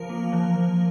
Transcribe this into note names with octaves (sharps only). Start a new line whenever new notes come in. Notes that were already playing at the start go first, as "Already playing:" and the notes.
Already playing: F3 A#4
A#3
F3
F3